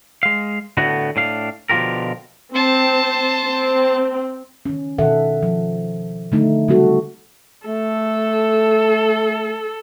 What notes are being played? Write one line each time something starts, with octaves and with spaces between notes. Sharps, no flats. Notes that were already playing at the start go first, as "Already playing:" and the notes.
G#3 F5
A2 D3 A3 B3 F#4
A2 D4 F5
B2 D3 F3 F4 G4 A#4
C4 C5 A5
C4
D#3 C#4
B2 D#3 A4 E5 F#5
F3
D3 A3 D#4
C#3 F#3 G3 C4 F#4 A4
A3 A4